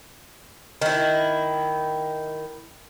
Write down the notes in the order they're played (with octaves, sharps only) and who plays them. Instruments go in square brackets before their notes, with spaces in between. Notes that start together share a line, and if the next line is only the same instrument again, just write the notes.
[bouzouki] D#3 E4